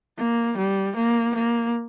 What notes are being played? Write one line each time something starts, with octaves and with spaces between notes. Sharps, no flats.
A#3
G3
A#3
A#3